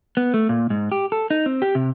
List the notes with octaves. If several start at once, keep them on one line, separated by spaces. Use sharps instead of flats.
B3
A3
A#2
G#2
G4
A4
D#4
C4
G4
C3